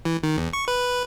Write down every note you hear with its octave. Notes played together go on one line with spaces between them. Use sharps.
E3
D#3
E2
C#6
B4